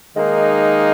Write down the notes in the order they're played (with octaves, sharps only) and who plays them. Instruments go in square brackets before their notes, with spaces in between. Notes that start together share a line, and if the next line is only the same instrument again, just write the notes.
[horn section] D#3 A#3 D#4 [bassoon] G#3